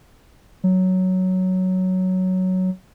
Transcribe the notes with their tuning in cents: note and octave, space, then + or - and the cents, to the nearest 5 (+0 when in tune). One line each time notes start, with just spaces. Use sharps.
F#3 +5